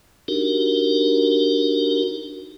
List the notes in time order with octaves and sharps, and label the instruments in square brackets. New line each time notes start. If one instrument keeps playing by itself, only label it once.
[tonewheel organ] D4 D#4 F#4 G4 A#4